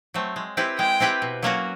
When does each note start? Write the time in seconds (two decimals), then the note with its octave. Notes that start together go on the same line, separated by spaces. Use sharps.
0.14 F#3 A3 C4
0.36 G#3
0.57 C4 E4 G4 B4
0.79 G#3 G5
1.00 C4 E4 G4 B4
1.22 B2
1.43 F#3 A#3 C#4 F#4